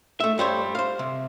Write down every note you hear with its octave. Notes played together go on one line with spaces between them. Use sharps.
A3 E5
G2 G3 C5 C#5
C5 F5
C3